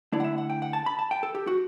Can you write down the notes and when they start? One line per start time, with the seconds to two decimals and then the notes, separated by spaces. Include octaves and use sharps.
0.12 D3 A3 E4 D5
0.20 F#5
0.24 E5
0.38 F#5
0.50 G5
0.62 F#5
0.73 A5
0.86 B5
0.99 A5
1.11 G5
1.23 A4
1.35 G4
1.47 F#4